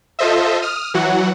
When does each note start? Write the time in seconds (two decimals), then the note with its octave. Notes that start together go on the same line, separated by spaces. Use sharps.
0.19 F4 A4 C5 D#5 E5
0.62 D#6 F6
0.94 E3 F#3 F#4 F#5